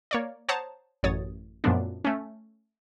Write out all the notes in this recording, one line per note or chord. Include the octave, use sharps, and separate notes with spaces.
A#3 C#5 D5
C5 C#5 F#5 A5 A#5 D#6
A1 F#2 C#5 D#6 A6
F#2 A#2 F3 A3 B3 D4
A3 C#4